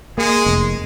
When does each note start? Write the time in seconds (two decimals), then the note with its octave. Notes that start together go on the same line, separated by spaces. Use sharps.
0.17 G#3 A#3 G#4
0.46 F1